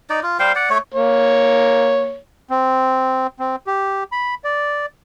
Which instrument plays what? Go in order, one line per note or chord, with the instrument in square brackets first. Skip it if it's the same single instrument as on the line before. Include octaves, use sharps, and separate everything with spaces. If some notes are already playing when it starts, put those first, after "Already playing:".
[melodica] D#4 D5
F4
G3 C5 F5 G5
D5 F#5
A3 C#5
[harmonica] A#3 C#5
[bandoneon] C4
C4
G4
B5
D5